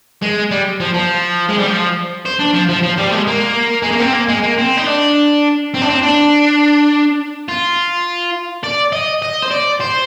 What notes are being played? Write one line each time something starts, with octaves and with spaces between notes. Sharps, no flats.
G#3
G3
F3
F3
G#3
G3
F3
C5
D4
F3
F3
F3
G3
G#3
A#3
G#3
A#3
C4
A#3
G#3
A#3
C4
D#4
D4
C4
D4
C4
D4
F4
D5
D#5
D#5
C5
D5
C5